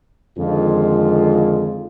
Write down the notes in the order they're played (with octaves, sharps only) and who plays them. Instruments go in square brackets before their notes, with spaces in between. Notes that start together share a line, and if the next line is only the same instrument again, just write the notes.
[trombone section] F2 D3 D#3 G#3 F4